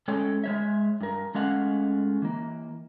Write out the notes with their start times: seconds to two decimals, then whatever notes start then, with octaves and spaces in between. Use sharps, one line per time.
0.08 G#3 A3 C#4 A4 C#5 G5
0.44 G#3 C#5 E5
1.01 G2 A#4
1.35 G#3 A3 C#4 D#5 F5 F#5
2.22 E3 A#3